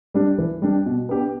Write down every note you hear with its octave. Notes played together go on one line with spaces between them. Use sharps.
G3 D4 G4
E3
G3 D4 G4
B2
B3 D4 G4